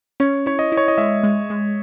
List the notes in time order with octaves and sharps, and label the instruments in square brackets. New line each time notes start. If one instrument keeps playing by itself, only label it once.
[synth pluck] C#4 [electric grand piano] C#5
[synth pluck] E4 [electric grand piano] C#5
[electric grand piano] D#5
[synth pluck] E4
[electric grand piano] C#5
D#5
[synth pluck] G#3 [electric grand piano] E5
[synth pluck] G#3
G#3